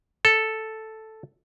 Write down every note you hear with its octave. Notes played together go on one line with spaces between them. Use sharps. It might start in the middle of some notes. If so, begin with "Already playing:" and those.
A4